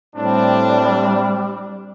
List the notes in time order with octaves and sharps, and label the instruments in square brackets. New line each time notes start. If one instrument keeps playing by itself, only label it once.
[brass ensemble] A2 C4 D4 [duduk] G3